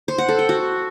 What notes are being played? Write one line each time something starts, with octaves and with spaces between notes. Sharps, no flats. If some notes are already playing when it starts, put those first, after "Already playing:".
C5
F#5
A4
G5
F#4